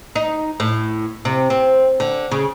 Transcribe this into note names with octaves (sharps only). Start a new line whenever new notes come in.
D#4
A2
C3
C4
D3
C#3